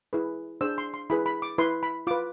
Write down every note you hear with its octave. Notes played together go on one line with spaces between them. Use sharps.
E4 G#4 B4
D4 G#4 C5 E6
C6
C6
E4 G#4 B4 B5
B5
D6
E4 B4 C6
B5
F4 B4 D6